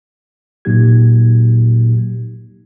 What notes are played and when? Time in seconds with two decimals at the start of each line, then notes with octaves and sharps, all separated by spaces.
0.65 A#2 F#3 A#3 D#4 G4 G#6